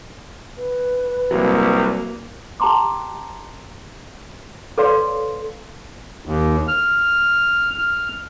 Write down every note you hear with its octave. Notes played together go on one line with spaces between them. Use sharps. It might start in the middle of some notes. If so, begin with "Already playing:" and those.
B4
C2 F#3 A#3
G4 G5 A5 A#5 C6 D6
A4 B4 C#5 D5 F5 C6
D#2
F6
F6